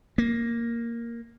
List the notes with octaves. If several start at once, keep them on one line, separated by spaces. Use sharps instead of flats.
A#3